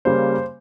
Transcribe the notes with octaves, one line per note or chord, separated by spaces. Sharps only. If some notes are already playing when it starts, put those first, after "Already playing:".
C#3 G3 A#3 C5